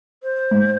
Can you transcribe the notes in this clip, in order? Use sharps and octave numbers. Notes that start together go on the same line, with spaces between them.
C5
G#2